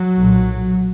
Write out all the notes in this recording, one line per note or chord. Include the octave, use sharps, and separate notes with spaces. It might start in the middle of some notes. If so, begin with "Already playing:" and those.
Already playing: F#3
B1 A#2